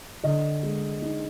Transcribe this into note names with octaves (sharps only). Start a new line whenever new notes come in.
D3 D#5
G#3
D#4